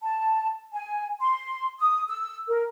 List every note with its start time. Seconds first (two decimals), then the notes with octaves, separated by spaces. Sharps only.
0.02 A5
0.73 G#5
1.21 C6
1.80 D#6
2.09 E6
2.48 A#4